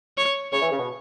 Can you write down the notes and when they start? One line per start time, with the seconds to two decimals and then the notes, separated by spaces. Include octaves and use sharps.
0.17 C#5
0.53 C#3 C#5
0.62 E3
0.71 C#3
0.79 B2